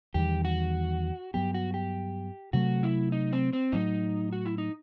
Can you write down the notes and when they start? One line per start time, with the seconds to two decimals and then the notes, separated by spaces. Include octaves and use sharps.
0.14 E2 D#3 G3 G4
0.45 F#4
1.34 G2 F#3 B3 G4
1.54 F#4
1.74 G4
2.53 C3 F#3 A3 F#4
2.83 E4
3.12 D#4
3.33 C4
3.53 C4
3.72 A2 F#3 A3 D#4
4.33 F#4
4.46 E4
4.58 D#4